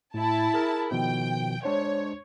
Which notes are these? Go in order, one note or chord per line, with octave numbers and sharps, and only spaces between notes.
A2 E4 A5
G#4 A#4
B2 D#3 F3 G5
G#3 D4 C5 C#5